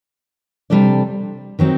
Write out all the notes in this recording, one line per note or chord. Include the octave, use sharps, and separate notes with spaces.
C3 G3 D4 A4 D5
D#3 F#3 C4 D#4